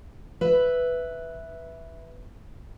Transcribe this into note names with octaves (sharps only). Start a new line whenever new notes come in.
B4 E5